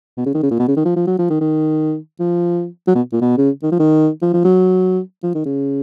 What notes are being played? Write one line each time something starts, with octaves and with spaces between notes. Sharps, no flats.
B2
C#3
D#3
C#3
A#2
B2
C#3
D#3
F3
F3
F#3
F3
D#3
D#3
F3
F#3
B2
A#2
B2
C#3
D#3
F3
D#3
F3
F3
F#3
F3
D#3
C#3